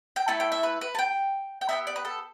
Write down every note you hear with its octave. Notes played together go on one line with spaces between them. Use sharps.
G5
A3 E4 A4 A5
G5
E5
B4
B4
A5
G5
G5
B3 D4 G4 E5
D5
B4
A4